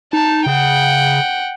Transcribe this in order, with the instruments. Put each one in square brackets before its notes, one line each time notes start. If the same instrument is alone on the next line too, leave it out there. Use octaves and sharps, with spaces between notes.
[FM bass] D#4 [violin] A5
[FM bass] C#3 [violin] F#5 G5